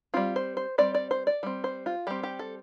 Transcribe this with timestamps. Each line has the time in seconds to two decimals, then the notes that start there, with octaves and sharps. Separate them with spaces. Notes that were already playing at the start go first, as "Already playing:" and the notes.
0.14 G3 C4 F4
0.36 C5
0.57 C5
0.78 G3 C4 D5
0.95 D5
1.11 C5
1.27 D5
1.43 G3 C4
1.64 C5
1.86 F4
2.07 G3 C4 G4
2.23 G4
2.39 A4